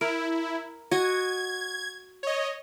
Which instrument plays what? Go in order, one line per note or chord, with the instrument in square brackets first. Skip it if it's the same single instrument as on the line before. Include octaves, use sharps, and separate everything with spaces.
[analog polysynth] E4 [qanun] A#4
[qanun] F#4 D#5 [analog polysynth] G#6
[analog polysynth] C#5 D#5